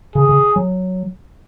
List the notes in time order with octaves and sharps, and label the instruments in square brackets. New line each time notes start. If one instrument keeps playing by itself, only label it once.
[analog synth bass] C#3 [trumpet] G#4
[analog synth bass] C#3
F#3